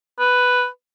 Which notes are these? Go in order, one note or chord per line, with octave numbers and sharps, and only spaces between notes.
B4